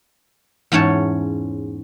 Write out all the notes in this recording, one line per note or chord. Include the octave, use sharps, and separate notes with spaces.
E2 G#2 C#4 C#5 A5